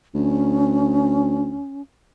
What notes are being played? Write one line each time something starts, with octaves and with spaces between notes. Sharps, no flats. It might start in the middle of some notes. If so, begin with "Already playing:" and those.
D2 C#4